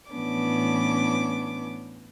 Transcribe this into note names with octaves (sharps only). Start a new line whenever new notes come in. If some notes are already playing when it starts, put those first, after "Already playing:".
A2 E3 B3 C#4 D4 D6